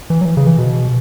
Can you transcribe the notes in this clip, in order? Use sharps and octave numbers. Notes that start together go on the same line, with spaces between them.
E3
F#3
E3
C#3
E3
B2